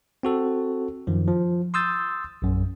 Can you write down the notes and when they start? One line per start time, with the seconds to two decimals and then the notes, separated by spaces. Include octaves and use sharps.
0.23 C4 F#4 A4
1.07 F#2 D#3 F3
1.28 F3
1.74 C6 D#6 E6 G6 A6
2.42 A#1 F#2